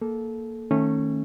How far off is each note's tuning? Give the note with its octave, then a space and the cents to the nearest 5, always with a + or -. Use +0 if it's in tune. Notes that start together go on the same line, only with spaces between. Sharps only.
A#3 -5 A4 -20
D#3 +0 A3 +10 C#4 -20